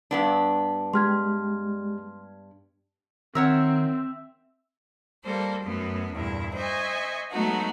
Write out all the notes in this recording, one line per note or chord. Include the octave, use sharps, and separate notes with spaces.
G2 B3 D4
G#3 G4 C6 F6 G#6
D#3 C4 A#4 C#5 E5 F#5
G3 A#3 A4 C5
F#2 A3 B3
E2 G2 A#2 E4
C5 D#5 E5 G#5 C#6
F#3 G#3 A3 B3 D#4 F#4